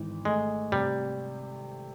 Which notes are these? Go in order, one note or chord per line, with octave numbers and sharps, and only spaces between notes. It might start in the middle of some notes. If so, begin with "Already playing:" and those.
Already playing: G#1 E3
G#3 A3
C3 G3